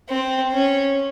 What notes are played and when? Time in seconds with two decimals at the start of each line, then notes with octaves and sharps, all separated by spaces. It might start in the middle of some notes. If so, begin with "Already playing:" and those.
0.09 C4
0.53 C#4